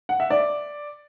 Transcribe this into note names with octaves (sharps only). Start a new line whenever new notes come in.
F#5
E5
D5